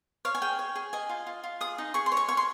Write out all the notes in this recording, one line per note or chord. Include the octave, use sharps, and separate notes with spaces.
C#5 F5
G#5
G#4 G5
C#5
G#4
D#5 G#5
F4
F4
F4
G#4 D#6
D#4
G#4 C#6
C6
C#5
C#6
C#5 C#6
C6